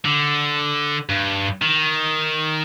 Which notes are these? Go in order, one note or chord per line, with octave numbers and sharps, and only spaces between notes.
D3
G2
D#3